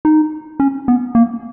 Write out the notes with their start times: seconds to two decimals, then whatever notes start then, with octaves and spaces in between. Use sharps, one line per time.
0.05 D#4
0.60 C#4
0.88 B3
1.15 A#3